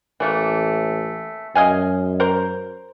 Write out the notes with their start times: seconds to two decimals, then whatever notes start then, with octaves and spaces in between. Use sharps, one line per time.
0.20 A1 E3 A3 A#3
1.55 F#2 D#5 F5 G#5
2.20 A#4 C5